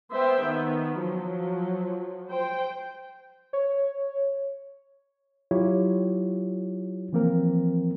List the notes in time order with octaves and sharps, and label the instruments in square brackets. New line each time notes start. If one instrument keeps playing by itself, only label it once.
[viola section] B3 C5 E5 G5
D#3 B3
F3 F#3
C5 G5
[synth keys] C#5
[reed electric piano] F#3 E4 F4 G4 C#5
E3 F3 A#3 C4 A#4